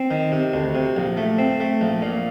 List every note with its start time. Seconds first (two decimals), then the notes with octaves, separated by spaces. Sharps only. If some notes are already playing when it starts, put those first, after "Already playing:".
Already playing: C4
0.11 D#3
0.32 C3
0.53 D2
0.75 C3
0.97 A#1
1.17 A3
1.39 C4
1.60 A3
1.81 A#1
2.02 A#2